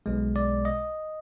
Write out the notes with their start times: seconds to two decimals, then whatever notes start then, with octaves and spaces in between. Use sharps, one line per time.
0.06 B1 B2 G#3
0.36 D5
0.65 D#5